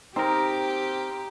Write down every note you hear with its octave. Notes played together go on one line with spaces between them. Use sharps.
C4 D#4 G4 A#4